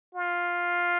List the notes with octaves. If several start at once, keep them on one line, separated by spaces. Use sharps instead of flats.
F4